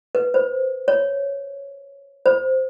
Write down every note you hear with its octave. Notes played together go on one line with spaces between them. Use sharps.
B4
C5
C#5
C5